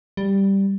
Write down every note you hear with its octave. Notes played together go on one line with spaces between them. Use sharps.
G3